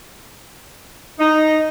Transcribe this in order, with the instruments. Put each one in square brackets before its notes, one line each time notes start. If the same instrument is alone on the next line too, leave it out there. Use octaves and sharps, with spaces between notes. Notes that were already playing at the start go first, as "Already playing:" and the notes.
[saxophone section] D#4